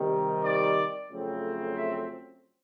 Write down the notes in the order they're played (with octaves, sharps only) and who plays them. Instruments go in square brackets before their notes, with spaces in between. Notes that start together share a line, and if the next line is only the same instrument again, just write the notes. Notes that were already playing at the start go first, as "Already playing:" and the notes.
Already playing: [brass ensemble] C3 D#3 G3
D5
F2 C#3 F#3 A3 C4
E5